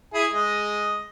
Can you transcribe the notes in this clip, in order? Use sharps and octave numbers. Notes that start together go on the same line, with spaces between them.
E4 G#4
G#3 D#5